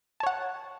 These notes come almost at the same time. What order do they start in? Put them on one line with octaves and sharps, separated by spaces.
A5 C#5 F#5